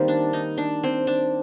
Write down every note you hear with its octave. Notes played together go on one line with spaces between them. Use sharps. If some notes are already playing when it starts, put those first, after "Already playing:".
Already playing: D#3 G3 A#3 C4
D4
D#4
D4
C4
D4